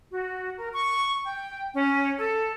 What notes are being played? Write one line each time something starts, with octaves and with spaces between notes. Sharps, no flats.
F#4
A#4
C#6
G5
C#4
A4